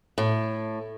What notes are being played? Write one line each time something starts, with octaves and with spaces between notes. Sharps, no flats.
A2